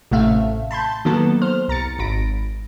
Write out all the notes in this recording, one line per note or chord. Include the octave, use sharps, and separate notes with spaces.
A1 A2 C3 A3 E5 F5
A5 B5 C6 G6
D#3 F#3 A#3 B3 A4
C5 F6
C2 A#5 A6 C#7
G#1 B5 A#6 D7